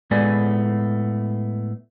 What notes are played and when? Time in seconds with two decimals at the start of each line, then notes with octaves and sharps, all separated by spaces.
0.11 A2 G#3 A3 B3 D5 G#5